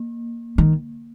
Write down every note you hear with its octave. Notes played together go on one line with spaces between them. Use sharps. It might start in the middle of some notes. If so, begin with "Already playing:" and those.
Already playing: A#3
D#3